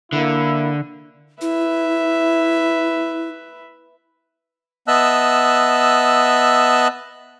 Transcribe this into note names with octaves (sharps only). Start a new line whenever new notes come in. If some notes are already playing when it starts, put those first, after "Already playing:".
D3 A#3 E4
E4 B4 E5
B3 D#5 E5 A5 E6 F#6